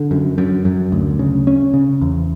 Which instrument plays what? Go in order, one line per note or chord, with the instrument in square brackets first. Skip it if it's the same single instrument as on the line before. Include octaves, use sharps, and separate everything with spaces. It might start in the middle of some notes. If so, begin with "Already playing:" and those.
Already playing: [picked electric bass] D3
F#2
F#2
F#2
D2
C#3
C#4
C#3
E2